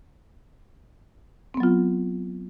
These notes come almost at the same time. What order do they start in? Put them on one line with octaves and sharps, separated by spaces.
C4 B3 F#3 F4